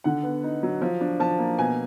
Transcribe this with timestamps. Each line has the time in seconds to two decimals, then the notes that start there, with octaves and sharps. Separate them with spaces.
0.04 D3 F#5
0.23 B3
0.44 D#4
0.63 F#3
0.81 F3
1.01 D4
1.20 F3 A5
1.39 A#3
1.58 B2 G#5